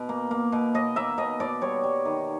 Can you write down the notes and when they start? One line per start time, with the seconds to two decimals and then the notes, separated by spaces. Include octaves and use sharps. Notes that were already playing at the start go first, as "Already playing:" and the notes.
Already playing: B2
0.09 A#3
0.31 A#3
0.52 B2
0.74 B2 D#5
0.96 A#3 E5
1.18 B2 D#5
1.40 B2 D5
1.61 G3 C#5
1.84 G3
2.05 D#3